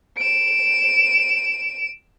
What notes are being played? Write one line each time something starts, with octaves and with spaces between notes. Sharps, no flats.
D7 E7